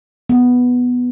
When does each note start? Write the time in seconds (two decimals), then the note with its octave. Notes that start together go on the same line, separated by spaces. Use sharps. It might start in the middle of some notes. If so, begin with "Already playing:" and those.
0.30 B3